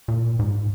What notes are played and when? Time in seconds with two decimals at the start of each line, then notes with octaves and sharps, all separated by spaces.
0.08 A#2
0.39 G#2